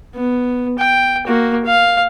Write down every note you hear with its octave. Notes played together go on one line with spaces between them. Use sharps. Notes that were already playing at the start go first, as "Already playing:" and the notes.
B3
G5
A#3 F#4
F5